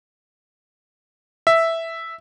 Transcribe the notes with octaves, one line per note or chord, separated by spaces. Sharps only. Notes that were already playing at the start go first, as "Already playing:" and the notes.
E5